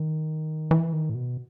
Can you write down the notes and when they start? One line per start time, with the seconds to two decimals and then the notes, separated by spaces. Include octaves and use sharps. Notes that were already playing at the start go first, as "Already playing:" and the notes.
Already playing: D#3
0.71 E3
0.93 D#3
1.10 A2
1.15 B2